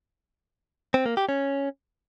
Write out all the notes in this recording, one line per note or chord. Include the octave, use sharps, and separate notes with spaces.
C4
A#3
G4
C#4